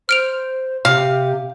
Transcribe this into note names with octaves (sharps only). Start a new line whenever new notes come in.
C5 F6 D7 F7
C3 G4 F5